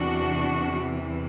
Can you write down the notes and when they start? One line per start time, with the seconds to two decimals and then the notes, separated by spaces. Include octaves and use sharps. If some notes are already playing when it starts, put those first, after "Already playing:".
Already playing: E2 C3 E3 D4 F#4